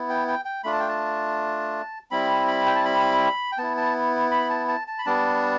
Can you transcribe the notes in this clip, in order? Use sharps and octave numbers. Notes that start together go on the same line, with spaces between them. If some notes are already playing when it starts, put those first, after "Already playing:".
Already playing: B3 E4
G5
G5
G5
A3 D4 F4 B5
A5
G5
A5
G3 C4 E4 B5
B5
G5
A5
B5
G5
B3 E4 A5
A5
B5
A5
A5
A5
B5
G3 B3 D4 A5